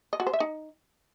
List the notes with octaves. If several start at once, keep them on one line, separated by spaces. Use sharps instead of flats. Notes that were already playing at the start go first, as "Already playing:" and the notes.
D#5
F#4
C5
E5
D#4